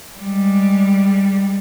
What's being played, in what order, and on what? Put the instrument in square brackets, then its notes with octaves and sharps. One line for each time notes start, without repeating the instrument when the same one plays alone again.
[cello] G3 G#3